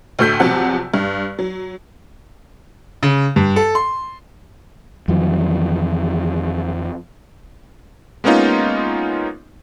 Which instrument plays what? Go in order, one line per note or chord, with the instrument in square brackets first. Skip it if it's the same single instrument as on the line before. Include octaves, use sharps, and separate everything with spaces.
[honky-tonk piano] D2 A2 A3 E6 G6 B6
E2 C3 F3 F#3 F#5
G2
F#3
[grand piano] C#3
G2
A4
C6
[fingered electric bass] F2 D#3 E3 F#3
[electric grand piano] G#3 A#3 B3 C#4 D#4 F4